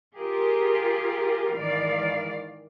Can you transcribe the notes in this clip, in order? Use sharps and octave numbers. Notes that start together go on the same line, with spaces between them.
F4 G4 G#4 A#4
G#2 D#3 E3 D5 F5